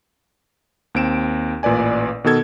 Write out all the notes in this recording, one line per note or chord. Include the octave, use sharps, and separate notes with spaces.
D#2 C4 D7 E7
A1 A#2 B4 D5 G#5
B2 D#3 B3 A4 G#6